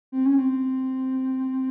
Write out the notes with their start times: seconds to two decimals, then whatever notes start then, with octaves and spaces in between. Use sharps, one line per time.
0.12 C4
0.26 C#4
0.38 C4